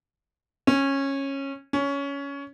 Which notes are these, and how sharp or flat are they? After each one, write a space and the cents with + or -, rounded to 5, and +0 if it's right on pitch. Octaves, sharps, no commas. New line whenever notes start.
C#4 -15
C#4 +15